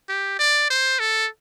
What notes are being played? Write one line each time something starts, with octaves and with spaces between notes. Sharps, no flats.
G4
D5
C5
A4